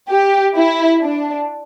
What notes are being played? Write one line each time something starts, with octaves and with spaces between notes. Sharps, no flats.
G4
E4
D4